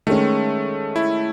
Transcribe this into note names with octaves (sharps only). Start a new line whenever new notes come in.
D#3 G#3 A3 C#4
E4